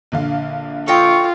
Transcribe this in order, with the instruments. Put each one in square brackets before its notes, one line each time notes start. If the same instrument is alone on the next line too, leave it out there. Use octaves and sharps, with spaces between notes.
[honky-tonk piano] A#1 D3 F5
[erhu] F4 [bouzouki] A4 D#5 G5 [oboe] C#6